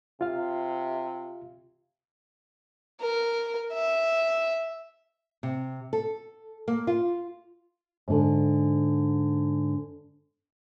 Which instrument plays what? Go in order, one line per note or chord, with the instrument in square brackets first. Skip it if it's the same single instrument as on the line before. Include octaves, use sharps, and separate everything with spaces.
[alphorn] C3 [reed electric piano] F4 F5
[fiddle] A#4
E5
[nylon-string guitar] C3
A4
A#3
F4
G#2 D3